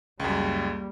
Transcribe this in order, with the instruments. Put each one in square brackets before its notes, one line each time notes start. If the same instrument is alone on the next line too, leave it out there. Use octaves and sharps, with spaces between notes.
[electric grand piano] C#2 F#2 [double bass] G3 A#3